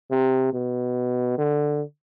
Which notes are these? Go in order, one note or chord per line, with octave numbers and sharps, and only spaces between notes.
C3
B2
D3